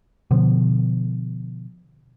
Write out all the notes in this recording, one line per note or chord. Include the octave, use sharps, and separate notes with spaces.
B2 D3 F3